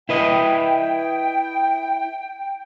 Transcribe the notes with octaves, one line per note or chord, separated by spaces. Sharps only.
E4 B4 D#5 G5